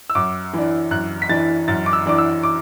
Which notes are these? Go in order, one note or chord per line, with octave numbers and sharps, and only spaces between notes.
E6
F#2 D6
E3 D4
F#2 F#6
B6
E3 D4 A6
F#2 A6
D6
E6
E3 D4 D6
E6
D6